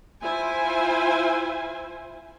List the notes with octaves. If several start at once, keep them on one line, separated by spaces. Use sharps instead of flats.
E4 F4 C5 G#5